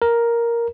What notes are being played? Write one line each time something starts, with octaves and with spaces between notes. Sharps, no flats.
A#4